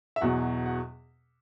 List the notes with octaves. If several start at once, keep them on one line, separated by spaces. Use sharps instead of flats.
E5
E2 B2 F#3 F#5
F#5